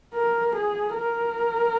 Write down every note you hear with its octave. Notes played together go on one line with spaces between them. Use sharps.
A#4
G#4
A#4